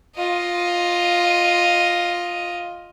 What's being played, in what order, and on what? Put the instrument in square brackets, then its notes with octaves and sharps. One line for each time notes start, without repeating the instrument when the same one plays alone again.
[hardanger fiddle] F4 D#5